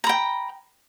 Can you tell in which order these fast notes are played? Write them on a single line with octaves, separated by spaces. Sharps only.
A#5 B5 G5